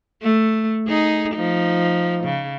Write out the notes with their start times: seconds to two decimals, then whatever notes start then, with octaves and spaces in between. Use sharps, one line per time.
0.22 A3
0.88 D#4 G#4
1.35 F3 D#4
2.24 C#3